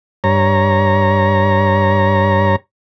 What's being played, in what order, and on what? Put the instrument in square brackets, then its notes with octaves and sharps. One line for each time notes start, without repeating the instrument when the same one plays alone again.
[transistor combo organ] G2 C#5 A#5